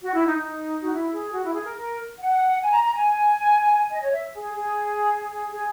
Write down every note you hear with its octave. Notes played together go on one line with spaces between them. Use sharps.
F#4
E4
D#4
D#4
F#4
E4
G#4
F#4
E4
G#4
A#4
A#4
F#5
G#5
A#5
A#5
G#5
D#5
C#5
E5
G#4
G#4
G#4